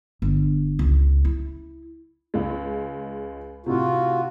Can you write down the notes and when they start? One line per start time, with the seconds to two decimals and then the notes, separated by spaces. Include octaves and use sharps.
0.22 G1
0.79 C#2
1.25 E4
2.34 C#2 G#3
3.66 A2 C3 F4 F#4